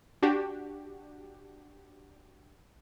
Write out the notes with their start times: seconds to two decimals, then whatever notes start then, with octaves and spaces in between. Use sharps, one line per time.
0.23 D4 F#4 G4